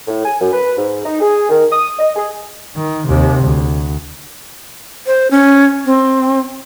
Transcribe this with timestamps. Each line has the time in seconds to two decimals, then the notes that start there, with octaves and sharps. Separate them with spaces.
0.07 A2
0.25 G#5
0.41 F#2
0.53 B4
0.77 G#2
1.04 D#4
1.21 G#4
1.49 D#3
1.72 D#6
1.99 D#5
2.16 G#4
2.77 D#3
3.07 D#2 C3
3.44 D2
5.06 C5
5.31 C#4
5.85 C4